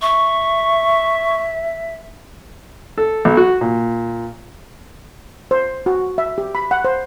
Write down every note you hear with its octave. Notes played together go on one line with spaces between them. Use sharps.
E5 C#6
A4
B1
F#4
A#2
C5
F#4
E5
G4
B5
F#5
C5